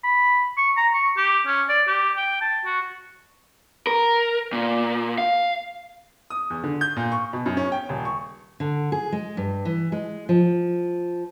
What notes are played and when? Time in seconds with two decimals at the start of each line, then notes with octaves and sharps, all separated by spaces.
0.04 B5
0.57 C#6
0.77 A#5
0.94 C#6
1.17 G4
1.46 C#4
1.69 D5
1.87 G4
2.16 G5
2.41 A5
2.65 F#4
3.87 A#4
4.52 A#2
5.18 F5
6.30 D#6
6.50 E2
6.63 D3
6.81 G6
6.96 A#2
7.12 C#6
7.33 B2
7.46 F#2
7.57 C#4
7.72 G5
7.89 D#1
8.05 C#6
8.60 D3
8.92 G#4
9.12 G#3
9.37 G2
9.65 E3
9.92 G#3
10.29 F3